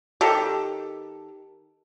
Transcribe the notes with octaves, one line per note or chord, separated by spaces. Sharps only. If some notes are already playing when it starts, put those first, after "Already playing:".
D#3 G4 A4